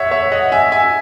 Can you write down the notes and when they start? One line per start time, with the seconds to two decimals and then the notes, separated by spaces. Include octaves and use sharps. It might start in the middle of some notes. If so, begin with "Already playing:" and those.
Already playing: C#5 E5 F#5
0.11 C#5 E5
0.32 D#5 F#5
0.52 E5 G#5
0.72 E5 G#5